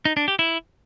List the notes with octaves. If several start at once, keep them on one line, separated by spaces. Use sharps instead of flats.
D#4
D4
G4
E4